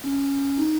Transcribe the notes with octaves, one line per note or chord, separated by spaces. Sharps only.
C#4
D#4